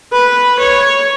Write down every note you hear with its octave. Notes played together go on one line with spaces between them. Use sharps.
B4
C#5